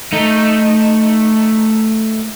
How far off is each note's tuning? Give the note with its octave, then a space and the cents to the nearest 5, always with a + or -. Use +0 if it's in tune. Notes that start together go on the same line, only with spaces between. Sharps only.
A3 +0 D#4 +0